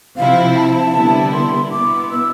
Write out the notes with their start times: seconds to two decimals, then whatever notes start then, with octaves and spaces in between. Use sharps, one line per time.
0.17 C3 F3 C4 E4 F5
0.56 A5
0.95 D3 G3 B3 E4
1.33 C6
1.72 B2 B3 E4 D6
2.10 E6